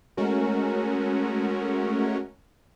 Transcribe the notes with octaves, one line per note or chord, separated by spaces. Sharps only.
G#3 A3 C#4 F#4 A#4